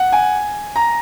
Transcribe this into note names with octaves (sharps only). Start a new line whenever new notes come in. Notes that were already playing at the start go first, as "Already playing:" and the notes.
Already playing: F#5
G#5
A#5